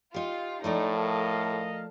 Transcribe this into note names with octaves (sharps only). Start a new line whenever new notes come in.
D#4 F4 G4
A2 F3 A3 D#4 D5
A4 A#4 D#5 F5 A5